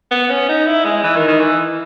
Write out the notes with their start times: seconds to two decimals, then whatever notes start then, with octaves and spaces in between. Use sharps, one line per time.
0.11 B3
0.30 C#4
0.49 D#4
0.66 E4
0.85 G#3
1.03 E3
1.16 D#3
1.28 D#3
1.40 E3